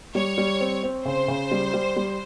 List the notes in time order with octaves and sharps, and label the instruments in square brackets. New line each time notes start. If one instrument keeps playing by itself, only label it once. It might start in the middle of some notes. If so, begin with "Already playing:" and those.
[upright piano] G3 [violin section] C#5
[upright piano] G3
C4
C4
[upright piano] C#3 [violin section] C5
[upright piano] C#3
G3
G3
G3